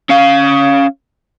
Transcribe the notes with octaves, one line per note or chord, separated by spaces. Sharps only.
C#4 F5